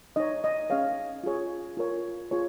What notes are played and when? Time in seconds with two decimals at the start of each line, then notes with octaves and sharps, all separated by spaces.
0.16 D#4 C#5 D#5
0.44 D#5
0.70 C#4 G#4 C#5 F5
1.24 F4 G#4 C#5
1.77 F4 A#4 C#5
2.31 F4 G#4 C#5